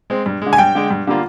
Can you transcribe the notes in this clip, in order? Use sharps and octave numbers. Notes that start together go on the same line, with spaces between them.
G#3 C4
G2
D3 G#3
G#5
G2 G5
D3 G#3
G2
D3 G3 A#3 F4